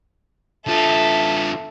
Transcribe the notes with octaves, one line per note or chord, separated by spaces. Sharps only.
D3 F4 A4 E5